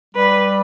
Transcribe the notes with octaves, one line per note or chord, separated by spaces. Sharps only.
G3 B4